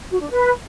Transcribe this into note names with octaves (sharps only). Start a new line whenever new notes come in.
F#4
D4
B4